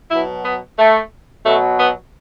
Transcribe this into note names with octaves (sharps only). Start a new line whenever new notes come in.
B2 F#3 E4
B3
A3
B2 F#3 A3
B3